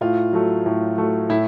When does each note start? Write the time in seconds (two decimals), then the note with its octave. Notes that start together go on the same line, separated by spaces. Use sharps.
0.01 A2 F4
0.33 F#3 A3
0.66 A2
0.98 F#3 A3
1.29 A2 E4